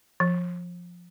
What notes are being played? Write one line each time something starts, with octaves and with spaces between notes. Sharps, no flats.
F3